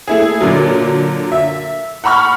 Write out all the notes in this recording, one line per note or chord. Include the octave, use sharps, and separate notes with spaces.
A3 E4 G#4
A#2 D3 F#3
E5
F#5 A#5 B5 C#6 F6